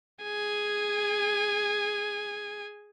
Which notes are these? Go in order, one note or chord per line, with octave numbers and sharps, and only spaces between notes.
G#4 G#5